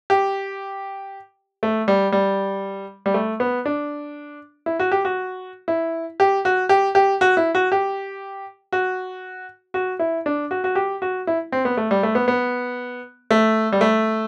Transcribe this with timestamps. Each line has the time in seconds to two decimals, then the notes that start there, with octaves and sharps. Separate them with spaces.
0.10 G4
1.63 A3
1.88 G3
2.12 G3
3.06 G3
3.14 A3
3.40 B3
3.66 D4
4.66 E4
4.79 F#4
4.92 G4
5.05 F#4
5.68 E4
6.20 G4
6.45 F#4
6.69 G4
6.95 G4
7.21 F#4
7.37 E4
7.55 F#4
7.72 G4
8.72 F#4
9.74 F#4
9.99 E4
10.26 D4
10.51 F#4
10.64 F#4
10.75 G4
11.02 F#4
11.27 E4
11.52 C4
11.65 B3
11.77 A3
11.91 G3
12.03 A3
12.15 B3
12.28 B3
13.31 A3
13.72 G3
13.81 A3